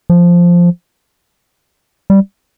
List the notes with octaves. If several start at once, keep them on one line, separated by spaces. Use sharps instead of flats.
F3
G3